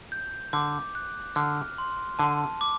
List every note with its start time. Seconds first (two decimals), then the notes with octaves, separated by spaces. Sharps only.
0.12 G6
0.53 D3 D6
0.95 F#6
1.36 D3 F6
1.78 C6
2.19 D3 A5
2.61 D6